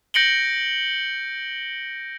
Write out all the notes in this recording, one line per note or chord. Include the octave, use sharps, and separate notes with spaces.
G6 A#6 C#7 D7 F#7 G7